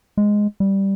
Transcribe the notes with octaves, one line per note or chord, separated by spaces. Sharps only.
G#3
G3